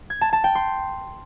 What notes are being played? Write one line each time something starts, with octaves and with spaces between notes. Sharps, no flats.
G#6
A5
A5
G5
C6